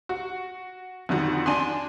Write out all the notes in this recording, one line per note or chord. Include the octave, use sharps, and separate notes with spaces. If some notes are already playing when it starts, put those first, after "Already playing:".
F#4
F2 D3 D#3 F#4
D4 G#5 C6